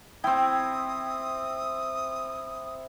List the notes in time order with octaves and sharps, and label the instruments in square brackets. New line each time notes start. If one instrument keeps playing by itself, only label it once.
[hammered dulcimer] C4 E4 [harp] G5 [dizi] D#6